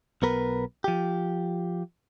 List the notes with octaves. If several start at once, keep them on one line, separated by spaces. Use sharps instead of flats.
B1 B3 A#4 B4
F3 G4